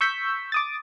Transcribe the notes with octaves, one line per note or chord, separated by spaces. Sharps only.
C#6 E6 G6 B6
D6 D#6 A6